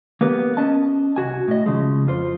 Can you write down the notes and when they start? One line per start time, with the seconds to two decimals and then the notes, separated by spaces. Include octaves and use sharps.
0.21 A#3 B3 G4 A#4
0.57 C#4 D#5 A5
1.16 C2 F#2 F#4 G#5
1.48 A2 D#5
1.66 C#3 F3 G#3
2.07 F2 F4 C5